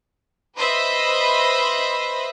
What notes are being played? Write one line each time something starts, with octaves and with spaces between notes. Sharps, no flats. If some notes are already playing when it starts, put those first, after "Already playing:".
B4 C5 D#5 E5 B5